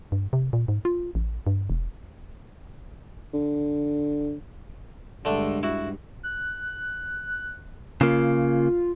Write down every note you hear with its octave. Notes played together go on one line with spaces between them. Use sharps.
G2
C3
A#2
G#2
F4
A1
G2
E1
D3
G2 D3 G#3 A3 D4
E4 F#4
F#6
C#3 A#3 F4